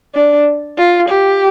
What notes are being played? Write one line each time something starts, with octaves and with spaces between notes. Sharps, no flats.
D4
F4
G4